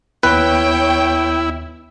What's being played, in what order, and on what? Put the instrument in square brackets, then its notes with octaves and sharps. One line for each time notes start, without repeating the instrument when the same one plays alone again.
[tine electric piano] D#2 B3 [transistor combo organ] E4 [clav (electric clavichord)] B4 [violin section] C#5 G5